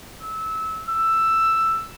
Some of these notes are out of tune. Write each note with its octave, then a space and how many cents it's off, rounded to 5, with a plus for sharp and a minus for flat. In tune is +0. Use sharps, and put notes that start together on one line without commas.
E6 -20
E6 +5